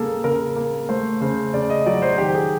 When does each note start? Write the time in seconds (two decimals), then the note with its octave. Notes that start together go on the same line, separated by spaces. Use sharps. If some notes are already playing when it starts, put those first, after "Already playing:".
Already playing: C#3 A#3 G#4 A4
0.24 C#3 A#4
0.56 A#3
0.89 A3 C5
1.21 C#3 C5
1.54 C#3 D5
1.70 D#5
1.86 F#3 D5
2.02 C5
2.18 D#3 G4
2.35 G#4